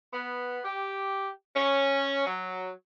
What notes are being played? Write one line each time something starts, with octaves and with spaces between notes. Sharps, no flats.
B3
G4
C#4
F#3